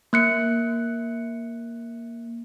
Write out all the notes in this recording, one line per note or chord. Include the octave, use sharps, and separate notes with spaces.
A#3 F#6 C#7